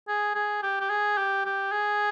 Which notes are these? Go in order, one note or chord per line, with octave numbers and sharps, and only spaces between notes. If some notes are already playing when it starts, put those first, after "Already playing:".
G#4
G#4
G4
G4
G#4
G4
G4
G#4